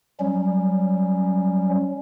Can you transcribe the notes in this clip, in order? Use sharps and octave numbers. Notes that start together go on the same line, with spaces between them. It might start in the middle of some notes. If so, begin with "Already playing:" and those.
F#3 G3 C#4